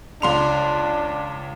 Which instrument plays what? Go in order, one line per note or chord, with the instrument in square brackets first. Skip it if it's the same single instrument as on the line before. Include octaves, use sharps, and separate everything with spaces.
[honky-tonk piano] C#2 C6 F7 [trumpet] D4